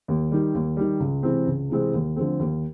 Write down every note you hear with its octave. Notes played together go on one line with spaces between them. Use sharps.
D#2
D#3 G3
D#2
D#3 G3
C#2
C3 E3 G#3 C4
C#2
C3 E3 G#3 C4
D#2
D3 F3 A3 C4
D#2